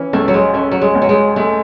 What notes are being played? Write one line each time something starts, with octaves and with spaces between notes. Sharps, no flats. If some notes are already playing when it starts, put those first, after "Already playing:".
Already playing: E3 C#4
C#2 A3
F#3
G#3
A3 C#4
F#3
G#3
C#2
F#3
G#3
G#3 A3